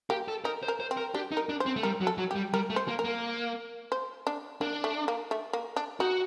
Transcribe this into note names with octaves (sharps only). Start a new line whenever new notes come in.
A#3 G4
A4
D#4 A#4
C5
A#4
C5
C4
A#4
D4 G4
D#4
A#4
D4
C5
C4
A3
G3 A#4
F#3
A4
F#3
G4
G3
G3 A#4
A3
C5
A#3
A#4
A#3
C5
D4
A#3 D4
A3
A#3
A3
A#3
D4
D#4 F#4